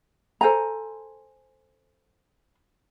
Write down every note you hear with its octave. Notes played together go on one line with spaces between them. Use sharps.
A4 C5 G#5 A#5